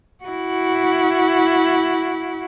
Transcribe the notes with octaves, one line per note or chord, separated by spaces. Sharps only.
E4 F#4